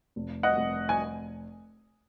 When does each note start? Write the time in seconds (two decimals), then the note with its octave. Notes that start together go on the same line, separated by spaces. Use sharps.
0.16 F1
0.43 D#5 F#5
0.57 F1
0.89 G#5